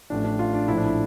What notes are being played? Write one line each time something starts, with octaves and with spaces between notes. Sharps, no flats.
A1 A2 F3 D4
D4
F4
D4
A#1 A2 F3 E4
D4
E4